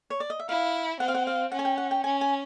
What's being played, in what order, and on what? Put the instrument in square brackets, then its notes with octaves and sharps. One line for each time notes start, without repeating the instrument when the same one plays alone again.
[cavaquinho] C#5
D5
D#5
E5
[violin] E4 [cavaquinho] F5
[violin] C4 [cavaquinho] F#5
[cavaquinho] F5
F#5
F5
[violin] C#4 [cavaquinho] F#5
[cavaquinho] G#5
G5
F#5
G5
[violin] C#4 [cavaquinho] G#5
[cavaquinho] G#5